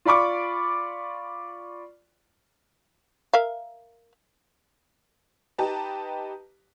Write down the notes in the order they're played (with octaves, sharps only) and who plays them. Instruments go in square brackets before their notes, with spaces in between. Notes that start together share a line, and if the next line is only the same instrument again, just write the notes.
[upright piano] F4 D5 B5 C#6 D6
[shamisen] A#4 E5 F5
[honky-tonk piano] D#4 G4 B4 A5 A#5